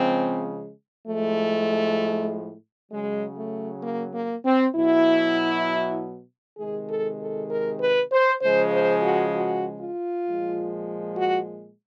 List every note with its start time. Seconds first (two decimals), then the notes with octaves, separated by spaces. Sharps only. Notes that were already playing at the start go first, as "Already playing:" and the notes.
Already playing: C#3 F3 G#3 C4
1.08 A2 F3 G#3 A3
2.91 C#3 F#3 G#3
3.38 A3
3.82 A#3
4.13 A#3
4.44 C4
4.74 B2 F#3 E4
6.58 C3 D#3 G#3 G#4
6.89 A4
7.20 A4
7.50 A#4
7.80 B4
8.11 C5
8.41 C#3 F3 G#3 C5
8.72 C5
9.02 F#4
9.33 F#4
9.80 F4
10.25 A#2 F3 G#3
11.17 F#4